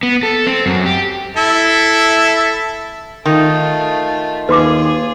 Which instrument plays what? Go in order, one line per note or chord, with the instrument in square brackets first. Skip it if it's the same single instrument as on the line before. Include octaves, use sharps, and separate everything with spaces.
[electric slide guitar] B3
A4
C4
F#2
G4
[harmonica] E4 A4 E5
[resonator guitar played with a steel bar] D#3 [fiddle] A3 F4
[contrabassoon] D#2 [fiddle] F4 G#4 [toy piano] B4 C6 D6